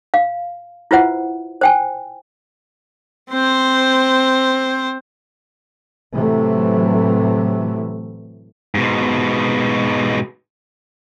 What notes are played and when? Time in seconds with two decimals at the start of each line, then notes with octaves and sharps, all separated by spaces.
0.14 F5
0.91 E4 F4 B4 C5 E5 F#5
1.61 C5 G5 G#5
3.31 C4 C5
6.13 A2 C3 E3 F#3 A3
8.75 G#2 B2